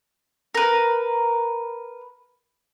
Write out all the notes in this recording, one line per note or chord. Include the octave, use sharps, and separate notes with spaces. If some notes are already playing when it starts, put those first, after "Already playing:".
A#4 B4